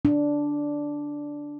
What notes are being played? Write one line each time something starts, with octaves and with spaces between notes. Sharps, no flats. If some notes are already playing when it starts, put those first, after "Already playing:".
D4